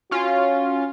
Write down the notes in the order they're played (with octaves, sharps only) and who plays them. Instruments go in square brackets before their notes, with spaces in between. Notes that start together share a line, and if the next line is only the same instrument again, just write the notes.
[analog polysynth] C#4 F4 [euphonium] F#4